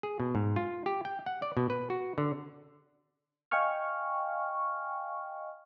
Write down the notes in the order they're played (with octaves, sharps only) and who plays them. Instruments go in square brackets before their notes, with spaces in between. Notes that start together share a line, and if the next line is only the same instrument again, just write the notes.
[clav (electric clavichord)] G#4
B2
G#2
F4
G4
G5
F#5
D5
B2
B4
F#4
D3
[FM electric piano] D#5 F5 G5 G#5 C#6 F6